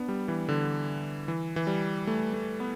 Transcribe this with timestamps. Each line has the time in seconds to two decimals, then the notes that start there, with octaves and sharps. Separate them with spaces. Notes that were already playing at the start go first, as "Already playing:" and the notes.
Already playing: B3 D4
0.08 G3
0.28 E3
0.48 D3
1.28 E3
1.56 E3
1.67 G3
2.07 A3
2.34 A3
2.60 B3